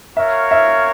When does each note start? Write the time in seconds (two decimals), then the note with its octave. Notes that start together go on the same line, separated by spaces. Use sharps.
0.16 F#4 A#4 C#5 E5 F5
0.51 E5